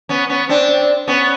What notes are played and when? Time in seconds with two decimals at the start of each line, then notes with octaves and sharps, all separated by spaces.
0.09 B3 C#4
0.29 B3 C#4
0.49 C4 D4
1.08 B3 C#4